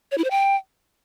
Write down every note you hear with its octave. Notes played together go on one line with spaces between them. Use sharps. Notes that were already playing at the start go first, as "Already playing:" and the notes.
C#5
E4
C5
G5